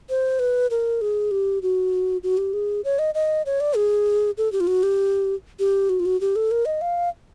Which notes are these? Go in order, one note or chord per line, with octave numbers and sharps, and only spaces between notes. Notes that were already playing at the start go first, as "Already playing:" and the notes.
C5
B4
A#4
G#4
G4
F#4
F#4
G4
G#4
C#5
D#5
D#5
C#5
D5
G#4
A4
G4
F4
F#4
G4
G4
F#4
F4
F#4
G4
A4
A#4
D#5
F5